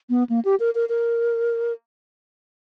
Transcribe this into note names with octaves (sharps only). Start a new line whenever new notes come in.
B3
A#3
G4
A#4
A#4
A#4